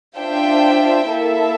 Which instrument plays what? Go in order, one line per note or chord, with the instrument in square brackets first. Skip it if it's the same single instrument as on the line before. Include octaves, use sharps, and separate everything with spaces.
[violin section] D4 F4 C5 E5 G5
A#3 E4 A4 E5